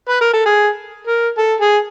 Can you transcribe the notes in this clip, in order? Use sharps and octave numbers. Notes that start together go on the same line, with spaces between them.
B4
A#4
A4
G#4
A#4
A4
G#4